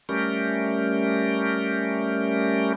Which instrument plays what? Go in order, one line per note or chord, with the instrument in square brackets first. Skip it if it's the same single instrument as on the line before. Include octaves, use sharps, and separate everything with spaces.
[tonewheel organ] G3 A3 C#4 G4 A#4